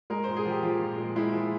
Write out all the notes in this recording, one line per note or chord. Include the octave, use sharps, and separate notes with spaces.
G#3 A#4
A#2 C5
G#4
F3 G4
F3 F4
A#2
G#3
G#3 E4
F3